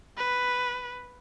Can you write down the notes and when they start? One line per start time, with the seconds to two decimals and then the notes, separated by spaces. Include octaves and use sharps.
0.17 B4